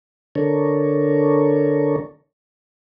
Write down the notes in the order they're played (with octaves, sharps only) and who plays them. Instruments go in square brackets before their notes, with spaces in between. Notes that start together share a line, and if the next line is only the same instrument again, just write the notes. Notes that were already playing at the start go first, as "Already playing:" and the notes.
[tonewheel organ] D3 D4 A4 A#4 C#5